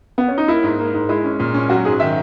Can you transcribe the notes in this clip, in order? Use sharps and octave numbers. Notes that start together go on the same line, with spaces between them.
B3
C#4
D#4
A#3 E4
G#2
A#3
G#2
G#3 E4
C#4
A#2
C#4
F#3 F#4
G#2 G#4
D#3 E5